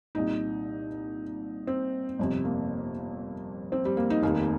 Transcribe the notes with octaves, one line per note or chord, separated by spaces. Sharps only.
C2 A#2 D#4
C4
G1 F2 C3
A#3
C4
G3
A#3
D#4
F1 D#2 D#3 A#3